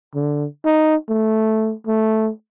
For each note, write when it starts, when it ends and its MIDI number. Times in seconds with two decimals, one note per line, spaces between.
0.15 0.45 50
0.65 0.96 63
1.09 1.72 57
1.87 2.30 57